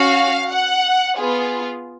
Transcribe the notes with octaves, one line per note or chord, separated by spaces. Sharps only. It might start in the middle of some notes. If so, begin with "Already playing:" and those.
Already playing: C#4 F#4 F5
F#5
B3 F4 G#4